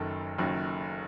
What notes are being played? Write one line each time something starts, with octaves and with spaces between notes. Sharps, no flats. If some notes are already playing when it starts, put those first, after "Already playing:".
Already playing: F#1 F#2 D#3 A4
F#1 F#2 D#3